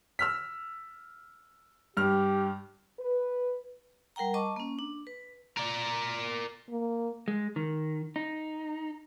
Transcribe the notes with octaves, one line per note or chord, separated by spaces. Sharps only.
E6 F6 B6
G2 G4 F6
B4
G3 A#4 F#5 G5 A#5
D#5 A5 C#6 D6
A#3 C#4
D4
B4
A#4 D5
A#3
G#3
D#3
D#4